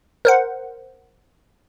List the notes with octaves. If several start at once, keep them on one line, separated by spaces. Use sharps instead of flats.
A#4 C5 F#5